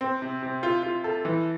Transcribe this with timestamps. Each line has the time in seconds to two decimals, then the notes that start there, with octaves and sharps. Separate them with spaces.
0.01 C4
0.22 C3
0.43 C3
0.63 F4
0.83 F4
1.04 A4
1.25 E3